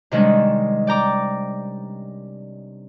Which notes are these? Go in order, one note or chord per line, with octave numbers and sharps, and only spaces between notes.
C3 D#3 G3 G#3 C#4 D4
D5 G5 A#5 D6